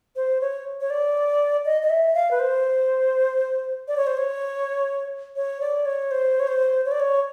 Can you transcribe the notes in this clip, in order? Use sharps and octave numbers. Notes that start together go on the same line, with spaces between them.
C5
C#5
C#5
D5
D#5
D#5
E5
F5
B4
C5
D5
C#5
C5
C#5
C#5
D5
C#5
C5
C#5
C5
C#5
D5
C#5